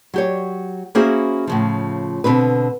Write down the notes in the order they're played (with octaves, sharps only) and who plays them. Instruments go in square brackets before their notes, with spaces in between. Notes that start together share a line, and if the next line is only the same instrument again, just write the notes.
[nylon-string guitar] F#3 G4 C#5
A#3 C#4 E4 F#4 G#4 C5
A2 C#3 F3
B2 D3 C4 B4